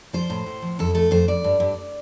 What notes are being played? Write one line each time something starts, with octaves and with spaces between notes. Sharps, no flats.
F3 C5
A2
A2
F3
F2 A4
A3 A4
F2 C5
F2 D5
G2
G2